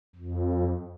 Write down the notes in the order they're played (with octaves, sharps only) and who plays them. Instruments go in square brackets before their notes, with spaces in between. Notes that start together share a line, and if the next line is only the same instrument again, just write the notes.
[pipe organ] F2